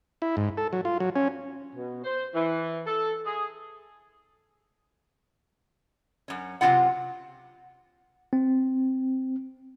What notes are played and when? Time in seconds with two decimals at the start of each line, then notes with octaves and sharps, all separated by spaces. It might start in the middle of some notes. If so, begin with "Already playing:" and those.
0.22 E4
0.37 G#2
0.58 A4
0.73 F#3
0.85 F4
1.00 F#3
1.16 C#4
1.75 B2
2.04 C5
2.34 E3
2.87 A4
3.26 G#4
6.28 F#2 C#4
6.61 C3 F#3 G3 C4 F4 F#5
8.33 C4